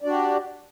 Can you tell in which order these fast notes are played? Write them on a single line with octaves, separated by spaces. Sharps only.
D5 D4 F#4 G4